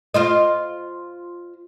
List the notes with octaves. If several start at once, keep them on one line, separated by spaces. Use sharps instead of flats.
F4 C5 D#5